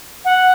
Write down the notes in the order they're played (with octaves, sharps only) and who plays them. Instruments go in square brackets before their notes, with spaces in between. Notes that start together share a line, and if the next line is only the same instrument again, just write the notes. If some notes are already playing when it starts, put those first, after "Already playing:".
[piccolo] F#5